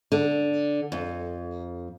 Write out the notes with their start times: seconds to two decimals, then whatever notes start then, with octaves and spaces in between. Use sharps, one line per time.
0.12 D3
0.92 F2